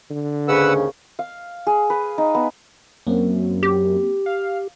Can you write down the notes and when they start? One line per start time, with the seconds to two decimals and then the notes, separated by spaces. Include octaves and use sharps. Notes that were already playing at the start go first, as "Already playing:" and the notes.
0.11 D3
0.48 D#2 G#2 C#3 B4 F#5 E6
1.19 F5
1.67 G#4
1.90 B4
2.18 D#4
2.35 B3
3.07 F#2 A#3 C4
3.63 G4
4.26 F5